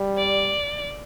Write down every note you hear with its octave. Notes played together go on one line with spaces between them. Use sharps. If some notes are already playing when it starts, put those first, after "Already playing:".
Already playing: G3
D5